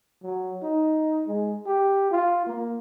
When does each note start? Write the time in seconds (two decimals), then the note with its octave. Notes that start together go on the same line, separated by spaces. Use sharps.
0.23 F#3
0.62 D#4
1.28 G#3
1.66 G4
2.11 F4
2.47 A#3